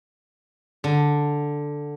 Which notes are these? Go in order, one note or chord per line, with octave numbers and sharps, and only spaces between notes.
D3